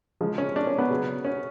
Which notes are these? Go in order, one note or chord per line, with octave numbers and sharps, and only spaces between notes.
C#3 F3 G#3
C#4
D4
C#4
B3
C#3 F#3
C#4